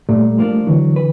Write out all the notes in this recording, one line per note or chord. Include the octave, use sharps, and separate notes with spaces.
A#2 G3 A3
F3 A#3 D4
D3 E3 F#3
B4